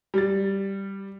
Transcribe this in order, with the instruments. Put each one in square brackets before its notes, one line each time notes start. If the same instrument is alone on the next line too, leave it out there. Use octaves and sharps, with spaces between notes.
[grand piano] G3 A6